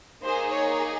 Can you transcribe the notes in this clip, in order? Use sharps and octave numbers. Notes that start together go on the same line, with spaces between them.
A#3 D#4 G#4 C5
C#5